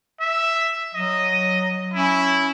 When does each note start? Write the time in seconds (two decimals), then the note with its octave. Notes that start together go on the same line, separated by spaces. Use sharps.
0.20 E5
0.95 F#3 D#5
1.94 C#4 E4